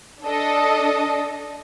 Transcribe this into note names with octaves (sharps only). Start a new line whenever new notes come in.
D4 A4 D#5